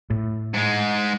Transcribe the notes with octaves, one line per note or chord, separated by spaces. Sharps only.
A2
G#2 G#3